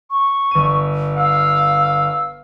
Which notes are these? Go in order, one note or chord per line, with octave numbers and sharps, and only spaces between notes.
C#6
G1 D#7
F5 E6